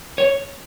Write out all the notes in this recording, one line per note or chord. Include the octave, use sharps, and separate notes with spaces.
C#5